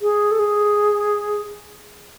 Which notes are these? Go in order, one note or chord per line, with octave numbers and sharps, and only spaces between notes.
G#4
A4
G#4